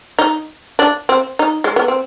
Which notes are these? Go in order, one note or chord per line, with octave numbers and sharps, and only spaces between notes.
D#4
D4
C4
D#4
G#3
B3
C4